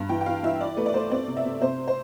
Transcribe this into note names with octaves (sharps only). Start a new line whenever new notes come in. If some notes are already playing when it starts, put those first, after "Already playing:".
Already playing: G2
E3 G5
G5
E3 F5
E3 E5
E4 D5
A3 B4
D5
A3 C5
C4 D5
C3
E5
C3
C3 C5
C5